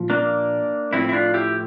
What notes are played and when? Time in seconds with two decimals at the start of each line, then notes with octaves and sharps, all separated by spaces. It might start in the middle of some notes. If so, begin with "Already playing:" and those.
Already playing: A#2 F3
0.10 A#3 D4
0.93 A2 F3 C4 E4
1.09 E4
1.13 D4 F4
1.34 E4 G4